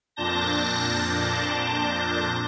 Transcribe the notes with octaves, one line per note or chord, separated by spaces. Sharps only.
F2 A#2 D4 A5 G6 A#6